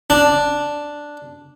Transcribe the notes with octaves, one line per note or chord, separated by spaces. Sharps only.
D4